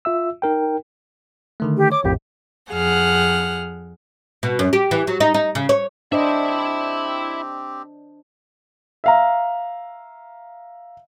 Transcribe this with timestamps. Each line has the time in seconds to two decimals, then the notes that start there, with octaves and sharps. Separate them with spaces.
0.05 F4 E5 E6
0.42 D#4 A#4 G5
1.60 D3 D#3 A3
1.77 G4
1.92 C#5 D6
2.04 A#1 F2 A2 G4
2.71 F2 G#4 F#5 F6
4.43 B2
4.59 F#2
4.73 G4
4.91 E3
5.07 F#3
5.20 D#4
5.34 D#4
5.55 C#3
5.69 C#5
6.12 C4 D4 E4 G4 C5 D#5 E5
9.04 E5 F5 A#5